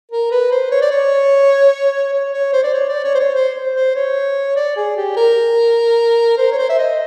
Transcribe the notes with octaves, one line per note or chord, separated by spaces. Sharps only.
A#4
B4
C5
C#5
D5
C#5
C#5
C#5
C5
D5
C#5
D5
C#5
C5
C#5
C5
C5
C5
C#5
D5
G#4
G4
A#4
C5
C#5
C5
E5
D#5